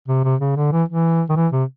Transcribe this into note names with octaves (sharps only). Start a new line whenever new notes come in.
C3
C3
C#3
D3
E3
E3
D#3
E3
C3